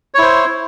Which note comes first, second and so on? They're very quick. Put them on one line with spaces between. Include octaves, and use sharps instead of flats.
C#5 E4 C5